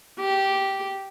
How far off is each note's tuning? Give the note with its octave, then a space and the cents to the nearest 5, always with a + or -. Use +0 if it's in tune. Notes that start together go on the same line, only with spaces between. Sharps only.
G4 -10